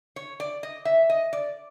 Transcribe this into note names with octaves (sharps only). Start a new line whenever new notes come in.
C#5
D5
D#5
E5
D#5
D5